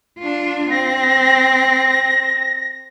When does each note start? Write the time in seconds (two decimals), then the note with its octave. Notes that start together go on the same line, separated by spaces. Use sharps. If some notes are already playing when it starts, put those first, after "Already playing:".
0.19 D4 F4
0.71 C4 A#6